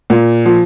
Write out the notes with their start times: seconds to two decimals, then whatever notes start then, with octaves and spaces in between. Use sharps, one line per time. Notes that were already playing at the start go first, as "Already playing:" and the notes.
0.10 A#2
0.46 F3